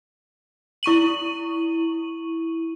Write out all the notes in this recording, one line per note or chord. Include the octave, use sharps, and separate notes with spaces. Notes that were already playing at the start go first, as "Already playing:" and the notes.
E4 C#6 D#7 F#7